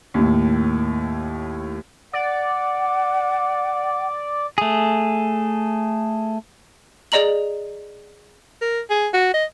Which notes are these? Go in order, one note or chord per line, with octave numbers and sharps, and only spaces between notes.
D#2 A2
D5 F#5
A3 G#4
G#4 D5 D#5 A#5 F#7
A#4
G#4
F#4
D#5